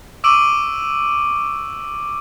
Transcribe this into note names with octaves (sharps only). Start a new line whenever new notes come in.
C#6 D6 E6 D7 D#7 F#7